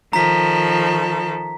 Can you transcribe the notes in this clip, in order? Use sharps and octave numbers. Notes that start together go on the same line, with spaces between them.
D#3 F3 A4 A#5 B6